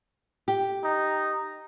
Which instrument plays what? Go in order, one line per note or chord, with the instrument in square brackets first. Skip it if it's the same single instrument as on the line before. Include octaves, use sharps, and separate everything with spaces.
[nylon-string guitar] G4
[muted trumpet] D#4